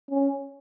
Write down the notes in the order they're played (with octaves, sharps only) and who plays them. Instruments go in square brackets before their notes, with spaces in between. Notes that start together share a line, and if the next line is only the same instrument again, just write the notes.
[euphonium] C#4